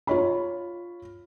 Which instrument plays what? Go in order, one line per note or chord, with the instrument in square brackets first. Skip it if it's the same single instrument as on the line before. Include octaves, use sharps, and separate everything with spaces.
[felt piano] F4 C#5 B5